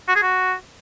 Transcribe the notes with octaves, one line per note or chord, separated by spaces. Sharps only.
F#4
G#4
F#4